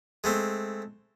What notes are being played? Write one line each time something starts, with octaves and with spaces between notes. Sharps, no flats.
G#3 A3 C4